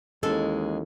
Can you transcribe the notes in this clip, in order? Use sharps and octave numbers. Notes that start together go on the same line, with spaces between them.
D#2 E3 G#3 C#4 E4 A4